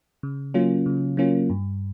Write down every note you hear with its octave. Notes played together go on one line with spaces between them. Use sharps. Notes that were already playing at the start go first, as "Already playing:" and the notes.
C#3
F#3 A#3 C#4 F4
C#3
F#3 A#3 C#4 F4
G2